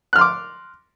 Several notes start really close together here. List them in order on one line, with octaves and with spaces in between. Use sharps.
F#6 F6 C6 D6